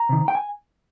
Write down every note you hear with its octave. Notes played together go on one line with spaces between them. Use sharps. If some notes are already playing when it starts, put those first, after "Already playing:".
Already playing: A#5
C3 D#3
G5
G#5